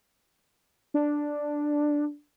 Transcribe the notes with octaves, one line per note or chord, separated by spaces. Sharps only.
D4